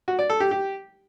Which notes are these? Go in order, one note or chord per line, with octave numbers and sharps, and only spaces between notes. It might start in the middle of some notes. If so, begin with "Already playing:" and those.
F#4
D5
A4
G4
G4